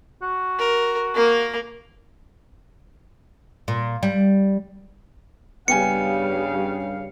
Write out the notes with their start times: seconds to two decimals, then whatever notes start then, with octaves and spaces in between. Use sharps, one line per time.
0.22 F#4
0.59 A#4
1.15 A#3 A#4
3.68 A#2
4.03 G3
5.68 G2 C#3 G3 B3 F5 G5 G#5 C#7